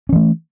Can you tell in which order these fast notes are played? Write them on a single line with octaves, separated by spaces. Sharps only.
C#4 E3 A3